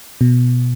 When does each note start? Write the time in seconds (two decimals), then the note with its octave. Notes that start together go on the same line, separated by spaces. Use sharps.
0.21 B2